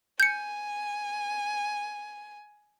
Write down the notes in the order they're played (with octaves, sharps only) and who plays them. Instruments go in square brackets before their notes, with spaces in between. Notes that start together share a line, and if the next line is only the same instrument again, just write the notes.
[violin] G#5 [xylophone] G6 C#7